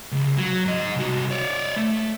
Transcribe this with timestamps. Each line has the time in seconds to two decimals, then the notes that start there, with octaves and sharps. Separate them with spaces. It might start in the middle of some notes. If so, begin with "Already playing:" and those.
0.12 C#2
0.37 F#3
0.66 G#2 D#5
0.96 C2 F#4
1.31 C#5 D5
1.76 A3